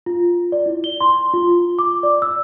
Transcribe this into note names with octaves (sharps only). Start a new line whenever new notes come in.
F4
D5
E4
G7
C6
F4
D6
D5
E6